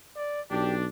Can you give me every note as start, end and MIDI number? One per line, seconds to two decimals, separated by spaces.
0.17 0.41 74
0.51 0.86 35
0.51 0.88 62
0.51 0.74 67